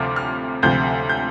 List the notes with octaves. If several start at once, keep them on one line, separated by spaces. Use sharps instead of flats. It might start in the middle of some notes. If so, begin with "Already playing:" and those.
Already playing: D2 C3 F3 D6 F6
F6
D2 C3 F3 G6
G6